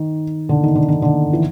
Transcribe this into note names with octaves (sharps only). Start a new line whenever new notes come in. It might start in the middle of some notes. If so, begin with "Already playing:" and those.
Already playing: D#3
D3
D#3
D3
D#3
D3
E3